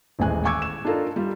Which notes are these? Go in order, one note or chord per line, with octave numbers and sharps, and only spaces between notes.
D#1 A1 A2 G#3 G#5 F#6
G#5 C#6 D6 E6 G#6
E7
D4 D#4 F4 A4 A#4
G3 F4